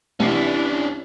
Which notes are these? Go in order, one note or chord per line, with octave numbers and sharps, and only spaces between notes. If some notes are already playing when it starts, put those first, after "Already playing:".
C2 E3 C#4 D4